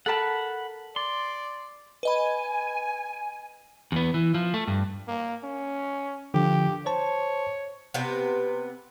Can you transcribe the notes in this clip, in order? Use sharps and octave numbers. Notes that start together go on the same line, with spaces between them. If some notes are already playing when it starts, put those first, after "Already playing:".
A4 A#4 F#5 A5 B5
D5 C6
B4 D#5 G#5 B5
E2 B3
E3
F3
A3
G2
A#3
C#4
D3 F3 G4
C5 C#5 A5
C3 B3